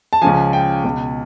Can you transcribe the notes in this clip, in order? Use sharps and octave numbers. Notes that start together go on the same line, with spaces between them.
A5
C#2 C#3 F3 G#5
G5
C#2 B2